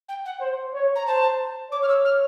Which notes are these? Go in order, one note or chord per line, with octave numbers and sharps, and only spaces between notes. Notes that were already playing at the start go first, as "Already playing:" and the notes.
G5
F#5
C5
C#5
A#5
C5 A5
C#5 D6
F6
E6
F6